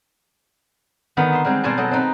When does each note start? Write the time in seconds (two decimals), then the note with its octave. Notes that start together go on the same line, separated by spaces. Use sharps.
1.17 D3 D#3 B3 D#4
1.33 E5 C6
1.44 G3 G#3 C4 D#4
1.64 B2 G3 C4 C5 G#5 A5
1.77 F#3 A4 D#5
1.91 C4 D#4 B4